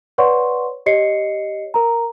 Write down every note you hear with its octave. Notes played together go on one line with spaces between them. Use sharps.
B4 C#5 D5 F#5 C6 C#6
G4 C#5 D#5 C7 C#7
A#4 A#5